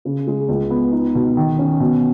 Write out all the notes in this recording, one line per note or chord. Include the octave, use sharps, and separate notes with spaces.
C#3
G#3
C#2
B3
D#4
B2
D#3
C#4
B2